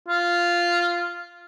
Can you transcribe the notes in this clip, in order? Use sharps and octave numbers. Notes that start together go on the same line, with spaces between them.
F4